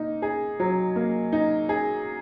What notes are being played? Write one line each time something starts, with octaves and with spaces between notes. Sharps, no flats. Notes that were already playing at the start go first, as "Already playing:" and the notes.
Already playing: A#3 D#4
G#4
F#3
A#3
D#4
G#4